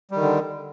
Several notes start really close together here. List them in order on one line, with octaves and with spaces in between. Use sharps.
G3 D#3 D3